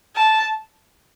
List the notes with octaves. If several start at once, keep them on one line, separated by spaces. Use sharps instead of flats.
A5